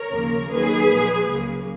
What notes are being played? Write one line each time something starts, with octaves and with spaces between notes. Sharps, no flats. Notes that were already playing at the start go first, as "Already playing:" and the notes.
Already playing: A#4 C#5
D#2 C#3 F3 A#3
D#2 D#3 F#3 A#3 G#4 B4
A#2 F3 G#3
C#2 C#3 F#3 A#3